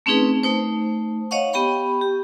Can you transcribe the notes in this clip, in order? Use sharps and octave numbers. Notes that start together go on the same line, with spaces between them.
A3 C4 C#4 D#4 G#4 B4
A3 D#4 C5
C#5 D#5 F5 F#5 C#6
B3 G4 G5 B5 C#6
G4